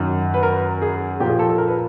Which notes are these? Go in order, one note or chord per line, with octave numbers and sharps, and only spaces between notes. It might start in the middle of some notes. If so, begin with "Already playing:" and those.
Already playing: F#2 D#3 F#3
B4
A#4
G#4
A#2 F3 A#3 G4
G#4
A4
A4
A#4
B4